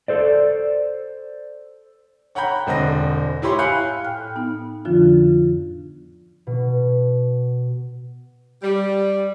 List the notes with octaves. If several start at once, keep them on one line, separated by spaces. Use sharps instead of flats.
A4 C5 D5
C#5 F#5 G5 A#5 B5 G6
E1 D3 C4 D#5 A#6
A2 E4 G4 C#5 B5 C6
F5 G#5 B5 F#6 G6 C#7
A2 G5 F6 F#6
B3 D#4
F2 D3 F3 D4 F4
B2
G3